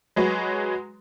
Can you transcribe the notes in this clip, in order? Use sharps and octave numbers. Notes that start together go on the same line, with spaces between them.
F#3 G#3 F#4 B4